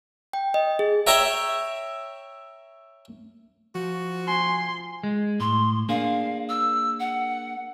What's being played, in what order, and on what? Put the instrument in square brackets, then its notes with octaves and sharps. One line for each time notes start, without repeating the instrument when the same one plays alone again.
[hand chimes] G5
D#5
G#4
[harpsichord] C#5 E5 G5 A#5
[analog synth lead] F3 [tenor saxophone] F#4
[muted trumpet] G#5 [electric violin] C6
[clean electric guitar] G#3
[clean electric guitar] A2 [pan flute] C6
[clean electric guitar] A#3 D4 G#4 [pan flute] F5
[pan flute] E6
F#5